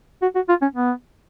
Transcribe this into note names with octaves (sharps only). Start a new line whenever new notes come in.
F#4
F#4
F4
C#4
B3